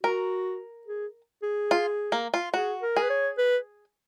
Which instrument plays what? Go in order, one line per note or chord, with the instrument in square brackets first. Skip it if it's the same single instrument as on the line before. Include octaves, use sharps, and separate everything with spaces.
[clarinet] F#4 [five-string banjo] A#4
[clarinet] G#4
G#4
[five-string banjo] F4
A#3
F4
[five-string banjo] F#4 [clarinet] G#4
[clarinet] A#4
[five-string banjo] G#4
[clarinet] B4
C#5
B4